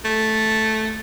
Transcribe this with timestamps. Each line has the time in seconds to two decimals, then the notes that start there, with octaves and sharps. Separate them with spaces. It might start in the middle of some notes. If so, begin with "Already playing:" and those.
0.05 A3